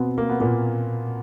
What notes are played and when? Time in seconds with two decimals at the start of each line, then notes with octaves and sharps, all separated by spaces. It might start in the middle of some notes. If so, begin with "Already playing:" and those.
Already playing: B2 B3 C4
0.18 A#3
0.30 B3
0.40 A#2 A#3